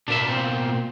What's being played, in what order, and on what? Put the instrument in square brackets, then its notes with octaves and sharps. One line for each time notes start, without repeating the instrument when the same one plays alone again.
[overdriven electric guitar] B2 A#3 [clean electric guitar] D4 E5
[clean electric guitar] C4